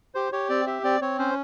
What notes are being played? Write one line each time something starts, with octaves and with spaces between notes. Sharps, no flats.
G4 C5
G4 C#5
C4 D5
G4 E5
C4 D5
C4 C#5
C#4 C5